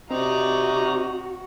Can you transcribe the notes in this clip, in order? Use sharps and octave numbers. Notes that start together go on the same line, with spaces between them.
C3 C4 D#4 F#4 D5 A#5